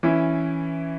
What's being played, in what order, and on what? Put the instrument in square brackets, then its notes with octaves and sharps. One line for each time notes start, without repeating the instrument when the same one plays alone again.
[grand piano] E3 C#4 E4